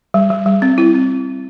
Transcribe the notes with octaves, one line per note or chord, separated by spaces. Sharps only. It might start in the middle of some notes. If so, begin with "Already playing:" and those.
G3
G3
G3
C4
E4
C4